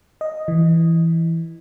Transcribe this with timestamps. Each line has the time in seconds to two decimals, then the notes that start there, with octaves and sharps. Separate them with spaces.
0.21 D#5
0.48 E3